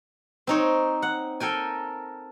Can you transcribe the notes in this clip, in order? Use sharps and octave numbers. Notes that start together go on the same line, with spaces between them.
C4 D#4 C#5
F#5
A4 A#4 G5 G#5